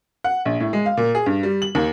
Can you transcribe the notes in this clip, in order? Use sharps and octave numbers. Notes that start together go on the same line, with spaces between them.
F#5
A#1
A2
G#3
F5
A#2
G#4
G2
G3
F#7
D#2